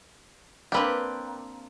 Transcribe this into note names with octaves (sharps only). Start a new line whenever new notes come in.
A#3 C4 D4 G4 B4